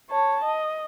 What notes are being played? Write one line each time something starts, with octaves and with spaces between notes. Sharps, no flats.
C#5 A5
D#5